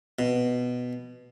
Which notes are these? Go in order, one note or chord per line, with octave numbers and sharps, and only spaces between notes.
B2